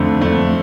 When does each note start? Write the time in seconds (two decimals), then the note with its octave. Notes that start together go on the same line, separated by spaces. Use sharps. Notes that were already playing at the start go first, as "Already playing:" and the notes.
Already playing: F2 D3 A3
0.21 F2 D3 A3